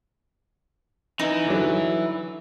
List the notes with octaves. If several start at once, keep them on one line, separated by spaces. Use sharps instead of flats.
E3 D#4
D3 F#3